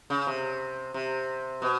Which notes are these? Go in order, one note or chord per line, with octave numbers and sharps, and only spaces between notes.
C#3
C3
C3
B2